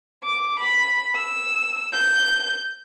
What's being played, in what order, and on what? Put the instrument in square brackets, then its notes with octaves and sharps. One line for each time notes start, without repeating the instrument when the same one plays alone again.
[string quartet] D6
B5
E6
G6